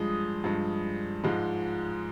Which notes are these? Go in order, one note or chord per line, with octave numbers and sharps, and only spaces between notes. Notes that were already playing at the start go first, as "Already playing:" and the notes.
Already playing: G2 F3 G#3 D#6
G2 F3 G#3
G#2 F3 G#3